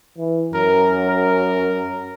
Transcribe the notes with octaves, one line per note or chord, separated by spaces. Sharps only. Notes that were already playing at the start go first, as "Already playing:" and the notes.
E3
F#2 A#4
A#4